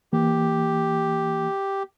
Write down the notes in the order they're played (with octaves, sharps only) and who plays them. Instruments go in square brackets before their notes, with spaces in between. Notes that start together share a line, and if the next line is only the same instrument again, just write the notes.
[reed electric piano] E3 A#3 [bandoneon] G4